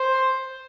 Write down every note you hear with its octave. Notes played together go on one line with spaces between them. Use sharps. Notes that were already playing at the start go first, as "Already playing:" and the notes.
Already playing: C5